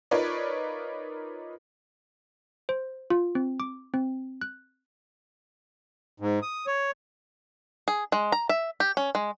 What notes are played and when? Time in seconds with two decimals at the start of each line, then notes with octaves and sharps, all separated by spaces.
0.11 D#4 F4 A#4 B4 C#5 D5
2.69 C5
3.10 F4
3.35 C4
3.60 D6
3.94 C4
4.41 F#6
6.20 G#2
6.42 D#6
6.67 C#5
7.88 G#4
8.12 G#3
8.32 A#5
8.49 E5
8.80 G4
8.97 C#4
9.15 G#3